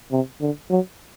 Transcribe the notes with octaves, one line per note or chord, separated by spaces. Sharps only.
C3
D3
F#3